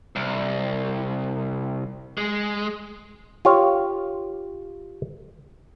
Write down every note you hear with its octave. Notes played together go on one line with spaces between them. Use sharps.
C2
G#3
F4 G4 C#5 F5